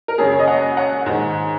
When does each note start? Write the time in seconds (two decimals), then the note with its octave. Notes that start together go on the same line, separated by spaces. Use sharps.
0.08 A#4
0.18 F#2 G#4 C#5
0.23 C#3
0.31 C#5
0.39 D#5
0.48 C#5 F#5
0.77 C#5 F#5
1.06 G#2 D#3